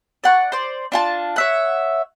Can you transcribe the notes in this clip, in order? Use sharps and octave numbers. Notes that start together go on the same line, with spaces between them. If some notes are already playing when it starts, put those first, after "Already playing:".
D5 F#5 C#6
C5 D5
D4 F4 A5
C#5 E5 F#5